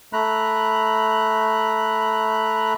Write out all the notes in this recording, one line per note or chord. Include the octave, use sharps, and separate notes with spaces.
A3 A#5 B5 F#6